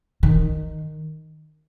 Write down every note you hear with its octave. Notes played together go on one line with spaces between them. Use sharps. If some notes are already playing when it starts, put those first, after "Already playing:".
D#3